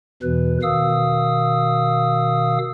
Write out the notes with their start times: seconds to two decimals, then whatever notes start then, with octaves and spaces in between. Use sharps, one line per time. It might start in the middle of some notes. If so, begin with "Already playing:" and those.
0.23 E2 B2 E3 B4
0.62 B2 D#3 F5 D#6 E6